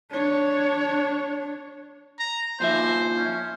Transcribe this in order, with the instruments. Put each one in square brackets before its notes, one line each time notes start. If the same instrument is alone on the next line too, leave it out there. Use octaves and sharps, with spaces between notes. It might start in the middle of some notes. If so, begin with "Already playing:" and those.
[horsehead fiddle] D4 C#5
[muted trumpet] A#5
[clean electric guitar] D#2 F3 E5 [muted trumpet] C5
[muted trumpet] C#4